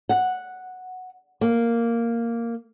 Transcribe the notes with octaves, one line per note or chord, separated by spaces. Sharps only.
F#5
A#3